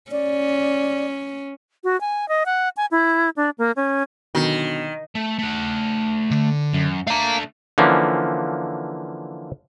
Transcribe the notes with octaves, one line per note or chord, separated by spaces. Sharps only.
C#4 D5
F#4
G#5
D#5
F#5
G#5
E4
D4
A#3
C#4
B2 D3 D#3 F#3
A3
A3 F#5
D3
F#2
D3 A3 F5 A#5
D3 E3 F3 A#3 C#4